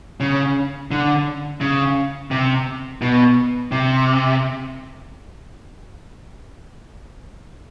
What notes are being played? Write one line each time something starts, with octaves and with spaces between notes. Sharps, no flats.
C#3
D3
C#3
C3
B2
C3